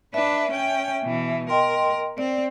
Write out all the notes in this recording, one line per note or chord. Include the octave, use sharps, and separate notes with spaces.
D4 B4 E5
C#4 G5
B2 E3
A#4 D#5 G5 C6
C4 D5